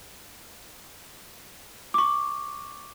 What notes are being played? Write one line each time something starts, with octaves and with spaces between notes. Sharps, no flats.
C#6 D6